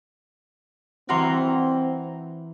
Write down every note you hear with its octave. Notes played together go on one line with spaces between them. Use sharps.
E3 C4 E4 F#4 A#5 C6 F6